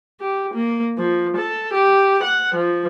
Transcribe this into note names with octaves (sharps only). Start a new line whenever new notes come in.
G4
A#3
F3
A4
G4
F#5
F3